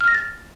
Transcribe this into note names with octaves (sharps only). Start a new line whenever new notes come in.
F6
A#6
A6